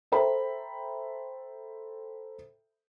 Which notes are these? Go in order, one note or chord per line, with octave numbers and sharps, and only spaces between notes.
A4 C5 E5 G5 A#5 B5